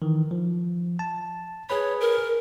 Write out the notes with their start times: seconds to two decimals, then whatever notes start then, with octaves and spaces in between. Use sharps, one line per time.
0.02 D#3 E3
0.31 F3
0.99 A5
1.70 G#4 B4 C#5 B5
2.01 A#4